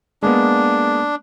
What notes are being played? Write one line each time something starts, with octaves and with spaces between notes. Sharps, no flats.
G#3 A#3 B3 D4